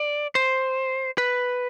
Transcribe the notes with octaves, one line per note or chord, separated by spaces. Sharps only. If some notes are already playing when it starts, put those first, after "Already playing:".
Already playing: D5
C5
B4